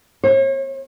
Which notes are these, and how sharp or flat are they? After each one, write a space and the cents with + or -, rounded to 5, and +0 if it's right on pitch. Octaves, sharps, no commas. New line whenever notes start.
C#5 -40